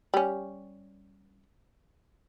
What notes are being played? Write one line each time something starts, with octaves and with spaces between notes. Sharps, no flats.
G3 C#4